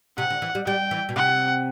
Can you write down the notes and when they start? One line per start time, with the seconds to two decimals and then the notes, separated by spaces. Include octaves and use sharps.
0.18 C3 F#5
0.30 D3
0.42 E3
0.55 G3
0.66 G3 G5
0.91 E3
1.09 B2
1.16 C3 F#5